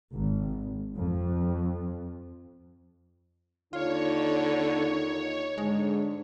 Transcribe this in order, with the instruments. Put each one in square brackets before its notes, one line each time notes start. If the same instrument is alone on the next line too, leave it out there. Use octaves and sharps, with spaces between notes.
[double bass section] G#1
F2
[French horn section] D#2 D#4 [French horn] D3 [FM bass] F4 [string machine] C#5
[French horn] G#2 [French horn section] D3 D4 [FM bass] G#3